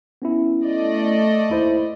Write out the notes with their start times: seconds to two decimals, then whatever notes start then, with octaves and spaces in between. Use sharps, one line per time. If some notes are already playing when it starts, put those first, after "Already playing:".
0.22 B3 C#4 E4
0.65 A3 D5 D#5
1.50 D#2 E4 C5